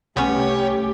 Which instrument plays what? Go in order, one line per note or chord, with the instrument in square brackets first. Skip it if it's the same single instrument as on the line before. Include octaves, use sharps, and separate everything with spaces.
[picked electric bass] C2 [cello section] A3 G4 [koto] B3 C#4 [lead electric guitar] C#5